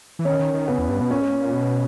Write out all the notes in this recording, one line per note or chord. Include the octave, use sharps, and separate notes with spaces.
E3
D#3 C#4 C#5
D#3
D#3
C#3 B3 B4
E2
G2
B2
A#2 C#4 C#5
G#2
A#2
B2